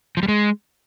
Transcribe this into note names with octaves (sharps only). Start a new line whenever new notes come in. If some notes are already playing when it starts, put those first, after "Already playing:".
F3
G3
G#3